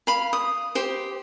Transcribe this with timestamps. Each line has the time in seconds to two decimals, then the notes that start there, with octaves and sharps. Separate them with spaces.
0.07 F5 B5
0.33 D#6
0.75 G4 C5